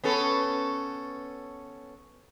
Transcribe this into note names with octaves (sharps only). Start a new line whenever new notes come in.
B3 C#4 A4